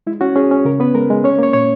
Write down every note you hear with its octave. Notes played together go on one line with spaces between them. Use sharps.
G#3 E4
C#4 F#4
C#4 G#4
C#4
C#3 A#4
B3 B4
G#3 A#4
G#3
C#4 C#5
A#3 C#5
A#2 C#5